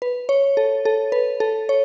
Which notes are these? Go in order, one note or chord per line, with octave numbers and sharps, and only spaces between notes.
B4
C#5
A4
A4
B4
A4
C#5